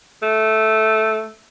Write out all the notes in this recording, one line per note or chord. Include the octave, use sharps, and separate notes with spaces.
A3